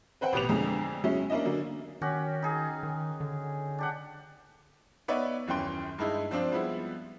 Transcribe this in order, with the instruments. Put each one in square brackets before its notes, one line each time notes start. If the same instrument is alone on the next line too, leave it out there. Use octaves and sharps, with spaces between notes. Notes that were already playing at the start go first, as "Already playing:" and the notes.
[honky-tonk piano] C4 B4 C5 F#5 G5
A1 B2 G4 B4 D6 F7
F2 D3 G#3 A#5
F#3 G#3 C#4 E4
A#3 C#4 D4 E4 D#5
D3 F#3 A#3
[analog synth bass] D#3 [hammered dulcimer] C#4 F#4 G4
[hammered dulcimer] D#4 G#4
[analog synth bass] D#3
D3
[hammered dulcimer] D4 G4 F#5
[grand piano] B3 D#4 B4 C#5 D5 E5
D#1 F#2 E3 C#4 G5 C6
G2 G#3 D#4 E4
F3 C4 D4 F4
F3 G3 G#3 B3 E4